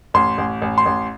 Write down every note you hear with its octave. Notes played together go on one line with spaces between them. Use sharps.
A1 C6
A1
A1
C6
A1